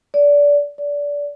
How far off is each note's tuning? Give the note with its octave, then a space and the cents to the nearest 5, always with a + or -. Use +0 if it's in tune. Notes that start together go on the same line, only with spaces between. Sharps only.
D5 -25
D5 -25